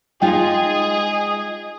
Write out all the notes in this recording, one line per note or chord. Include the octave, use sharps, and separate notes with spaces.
G#3 D#4 F4 G#4 D#5 G5